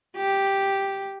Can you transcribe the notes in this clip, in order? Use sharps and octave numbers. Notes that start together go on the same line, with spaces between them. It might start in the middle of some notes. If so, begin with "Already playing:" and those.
G4